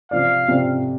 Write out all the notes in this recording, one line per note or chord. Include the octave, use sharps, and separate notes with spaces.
C3 F3 C4 F4 D5 F5
C3 F3 C4 F4 D5